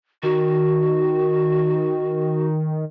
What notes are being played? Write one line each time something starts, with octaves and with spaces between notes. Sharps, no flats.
D#3 F#4